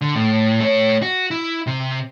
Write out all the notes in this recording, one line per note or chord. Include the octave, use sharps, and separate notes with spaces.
D3
A2
A3 C#5
F#4
E4
C3